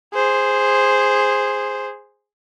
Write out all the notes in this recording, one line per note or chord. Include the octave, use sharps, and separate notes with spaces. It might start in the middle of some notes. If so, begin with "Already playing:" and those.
G#4 C5